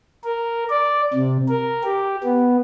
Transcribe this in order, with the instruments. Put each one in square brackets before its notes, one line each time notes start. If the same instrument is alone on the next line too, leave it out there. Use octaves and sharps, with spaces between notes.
[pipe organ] A#4
D5
C3
A#4
G4
B3